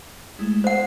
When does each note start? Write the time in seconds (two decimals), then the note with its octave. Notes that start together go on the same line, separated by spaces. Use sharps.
0.39 G#3 A3 E4
0.64 B3 C5 F#5